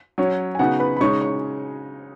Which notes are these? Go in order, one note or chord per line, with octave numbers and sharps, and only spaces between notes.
F#3 C#4 C#5
G#5
C#3 B3 D#4 F#4 F#5
B4 B5
B5
C#3 G#3 D#4 C#5 C#6
C#5 C#6